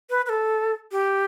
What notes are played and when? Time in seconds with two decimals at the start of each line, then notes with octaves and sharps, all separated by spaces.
0.10 B4
0.26 B4
0.29 A4
0.92 G4